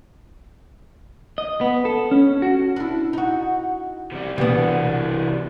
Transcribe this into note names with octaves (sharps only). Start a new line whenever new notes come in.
D#5
B3
A4
C#4
F#4
D4 E4
D#4 F#4
C3 G3
C2 B2 E3 B3 D4